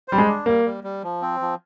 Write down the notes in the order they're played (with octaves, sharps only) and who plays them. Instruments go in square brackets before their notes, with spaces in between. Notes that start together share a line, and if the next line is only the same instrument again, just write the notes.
[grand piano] G3 [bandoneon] C5
[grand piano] G#3
[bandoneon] D4
[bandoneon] G3 [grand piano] A#3
[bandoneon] G3
G3
F3
C4
F3